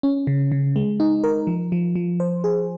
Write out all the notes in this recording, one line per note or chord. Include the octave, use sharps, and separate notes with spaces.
C#4
C#3
C#3
G#3
D#4
A#4
F3
F3
F3
C5
G#4